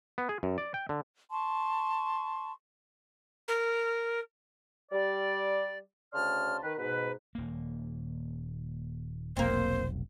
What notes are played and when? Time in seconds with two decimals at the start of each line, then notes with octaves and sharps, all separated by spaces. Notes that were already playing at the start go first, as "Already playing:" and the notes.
0.18 B3
0.29 G#4
0.43 F#2
0.58 D5
0.74 G5
0.89 D3
1.31 A5 C6 C#6
3.48 A#4
4.92 G3 D5
6.13 D2 C#3 D5 A5 C6 F6
6.62 D#3 B4
6.77 G#2 B2 B4
7.35 D#1 A#3
9.37 F1 B1 A#3 C4 C5